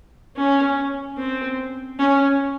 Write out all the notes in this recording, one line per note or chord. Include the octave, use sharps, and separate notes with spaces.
C#4
C4
C#4